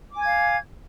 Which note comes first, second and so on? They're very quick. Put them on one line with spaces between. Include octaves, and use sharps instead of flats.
D6 G#5 G#6 F5